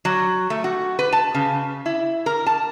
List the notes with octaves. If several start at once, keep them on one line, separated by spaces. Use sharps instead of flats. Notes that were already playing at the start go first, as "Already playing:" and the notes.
F#3
A3
F#4
B4
A5
C#3
E4
A#4
A5